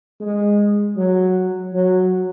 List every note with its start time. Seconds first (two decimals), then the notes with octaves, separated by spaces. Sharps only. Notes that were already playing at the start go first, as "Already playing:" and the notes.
0.21 G#3
0.96 F#3
1.73 F#3